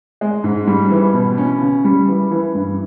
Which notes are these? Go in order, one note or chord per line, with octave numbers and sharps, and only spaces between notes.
G#3
G#2
G3
E3
B2
C#4
C#3
G3
E3
E3
G2